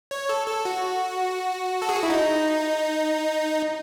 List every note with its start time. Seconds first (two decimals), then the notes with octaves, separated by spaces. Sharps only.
0.11 C#5
0.29 A4
0.48 A4
0.65 F#4
1.82 A4
1.89 G#4
1.96 F#4
2.03 E4
2.10 D#4